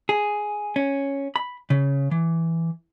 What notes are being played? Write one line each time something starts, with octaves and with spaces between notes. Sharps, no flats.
G#4
C#4
B5
C#3
E3